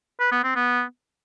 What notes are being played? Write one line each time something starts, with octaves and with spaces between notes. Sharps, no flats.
B4
B3
C4
B3